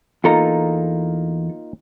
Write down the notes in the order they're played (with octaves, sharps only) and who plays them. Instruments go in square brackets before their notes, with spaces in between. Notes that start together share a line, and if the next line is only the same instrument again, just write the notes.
[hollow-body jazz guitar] E2 A4 A#5 [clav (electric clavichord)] A#3 D#4 F4